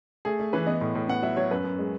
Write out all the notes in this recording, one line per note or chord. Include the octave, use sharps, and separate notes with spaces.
A3 G#4
A3
E3 B4
B3 D#5
A2
A2
B3 F#5
F#3 E5
F#3 C#5
F#2 B4
F#2
G#3